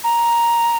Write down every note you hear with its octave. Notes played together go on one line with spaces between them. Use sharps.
A#5